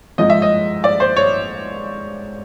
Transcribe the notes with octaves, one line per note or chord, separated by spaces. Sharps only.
G#2 F3 D#5
E5
D#5
D5
C5
C#5